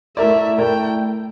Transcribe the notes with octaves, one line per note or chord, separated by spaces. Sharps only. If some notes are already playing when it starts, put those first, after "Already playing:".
A3 E4 A#4 D5 E5
A3 E4 A#4 D5 G5